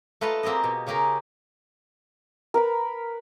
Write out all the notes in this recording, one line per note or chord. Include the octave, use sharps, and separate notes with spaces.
A3 F4 B4 D#5 F5 A5
A#3 C4 G4 G#4 D#5
B2
C#3 C#4 G4 G#4 A#4
A#4 B4 B5